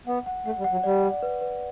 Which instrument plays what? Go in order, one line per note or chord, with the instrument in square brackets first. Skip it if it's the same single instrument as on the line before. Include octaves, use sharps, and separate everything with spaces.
[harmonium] B3 [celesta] F#5
[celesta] F#5
[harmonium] A3 [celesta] F#5
[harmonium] G3
[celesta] F#5
[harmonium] F#3
[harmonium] G3 [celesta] D5
[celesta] D5
B4
B4